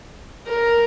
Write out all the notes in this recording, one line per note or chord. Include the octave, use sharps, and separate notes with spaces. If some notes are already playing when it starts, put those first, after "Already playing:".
A#4